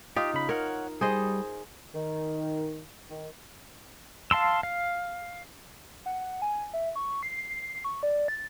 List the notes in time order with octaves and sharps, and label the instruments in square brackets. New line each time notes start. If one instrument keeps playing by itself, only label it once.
[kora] D#4 F4 [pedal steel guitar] G4
[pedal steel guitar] C#3 B5
[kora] A#4 [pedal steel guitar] C#5 F#5 F6
[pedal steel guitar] G3 [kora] G#4 C5 D#5
[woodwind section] D#3
D#3
[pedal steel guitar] F5 A5 C6 E6
F5
[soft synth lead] F#5
G#5
E5
C#6
C7
C#6
D5
A6